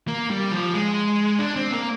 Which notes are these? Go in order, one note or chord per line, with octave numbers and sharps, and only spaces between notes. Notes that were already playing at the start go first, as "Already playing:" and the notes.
A#3
G3
F3
G#3
D4
C4
A#3